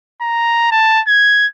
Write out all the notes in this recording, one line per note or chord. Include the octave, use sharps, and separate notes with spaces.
A#5
A5
G#6